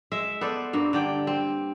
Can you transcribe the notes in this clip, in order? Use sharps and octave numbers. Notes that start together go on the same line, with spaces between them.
G#3 E5
B3 A4 C5 D5
G2 A#3
D3 D5 G5
C4